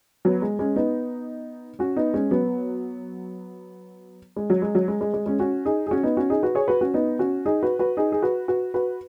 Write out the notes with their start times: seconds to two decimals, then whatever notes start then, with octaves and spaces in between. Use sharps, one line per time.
0.25 F#3 B3
0.42 G#3
0.59 G#3 C#4
0.76 B3 D#4
1.79 C#4 F#4
1.96 B3 D#4
2.14 G#3 C#4
2.31 F#3 B3
4.36 G#3
4.50 F#3
4.62 G#3
4.75 F#3
4.88 G#3
5.01 G#3
5.14 G#3
5.26 G#3 C#4
5.39 C#4 F#4
5.65 D#4 G#4
5.87 G#4
5.91 C#4 F#4
6.03 B3 D#4
6.17 C#4 F#4
6.30 D#4 G#4
6.42 F#4 B4
6.55 G#4 C#5
6.68 F#4 B4
6.81 C#4 F#4
6.94 B3 D#4
7.19 C#4 F#4
7.46 D#4 G#4
7.63 F#4 B4
7.79 F#4 B4
7.97 D#4 G#4
8.12 G#4
8.22 F#4 B4
8.48 F#4 B4
8.74 F#4 B4